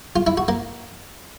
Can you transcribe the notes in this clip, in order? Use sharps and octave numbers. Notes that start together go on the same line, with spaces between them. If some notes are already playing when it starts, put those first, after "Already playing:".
F4
E4
F#4
A#3